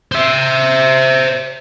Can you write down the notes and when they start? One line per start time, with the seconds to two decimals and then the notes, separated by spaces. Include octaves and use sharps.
0.12 C5 E5